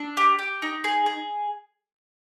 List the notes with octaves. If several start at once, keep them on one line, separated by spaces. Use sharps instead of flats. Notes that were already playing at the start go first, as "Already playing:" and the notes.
Already playing: D4 E6
G4
G4
D#4
G#4
G#4